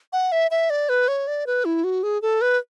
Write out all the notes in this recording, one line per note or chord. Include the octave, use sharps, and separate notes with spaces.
F#5
E5
E5
D5
B4
C#5
D5
B4
E4
F#4
G#4
A4
B4